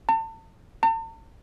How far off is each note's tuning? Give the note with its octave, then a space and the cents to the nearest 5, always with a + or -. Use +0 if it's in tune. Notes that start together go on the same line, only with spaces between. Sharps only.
A5 +35
A5 +45